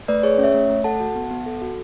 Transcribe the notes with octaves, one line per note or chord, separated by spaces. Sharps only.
A3 B4 D5
G#4 C#5
C#4
C#5 E5
A3
A3
A4 F#5 A5
F#4
B3
B3
A4
F#4